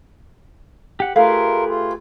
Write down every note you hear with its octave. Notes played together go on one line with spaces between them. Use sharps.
G4 F#5
A3 F4 G4 G#4 A#4 B4 F5
F4